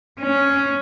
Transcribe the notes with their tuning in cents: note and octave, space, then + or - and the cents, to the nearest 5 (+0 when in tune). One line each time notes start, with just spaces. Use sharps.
C#4 +5